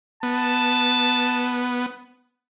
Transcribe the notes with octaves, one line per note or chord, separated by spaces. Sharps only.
B3 A5